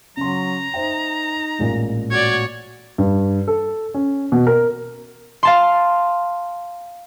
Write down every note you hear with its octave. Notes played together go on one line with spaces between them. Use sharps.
C#3 F#3 A#5 C6
D#4 C5 E5 G5
A1 A#2 G#3
F#4 C#5 D5 G#6
G2
A4
C#4
B2
A#4
F5 A5 C6